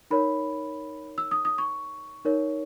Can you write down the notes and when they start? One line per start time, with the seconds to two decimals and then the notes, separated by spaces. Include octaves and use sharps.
0.11 D#4 A#4 C#5 B5
1.18 E6
1.31 D#6
1.45 D#6
1.58 C#6
2.25 D#4 A#4 C#5